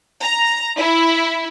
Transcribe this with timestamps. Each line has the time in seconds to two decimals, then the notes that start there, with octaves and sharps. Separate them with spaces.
0.22 A#5
0.78 E4